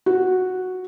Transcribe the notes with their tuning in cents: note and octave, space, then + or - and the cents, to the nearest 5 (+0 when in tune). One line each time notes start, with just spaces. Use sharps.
F#4 -5